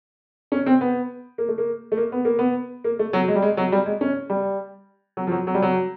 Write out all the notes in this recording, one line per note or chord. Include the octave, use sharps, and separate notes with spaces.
C#4
C4
B3
A#3
A3
A#3
A3
A#3
B3
A#3
B3
A#3
A3
F#3
G#3
G3
G#3
F#3
G3
G#3
C#4
G3
F#3
F3
F#3
F#3
G3
F#3